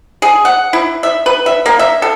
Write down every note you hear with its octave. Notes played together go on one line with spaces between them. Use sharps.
G#4
F#5
E4
E5
B4
E5
A#3
E5
A4